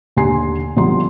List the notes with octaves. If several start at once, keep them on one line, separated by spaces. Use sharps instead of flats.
D#2 D3 G4 G#5 C6 C7
B1 D3 F3 G3 C#4 C6